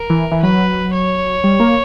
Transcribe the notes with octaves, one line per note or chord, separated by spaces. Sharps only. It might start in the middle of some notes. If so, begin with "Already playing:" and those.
Already playing: A#4
E3
E3
F#3 B4
C#5
G3
A#3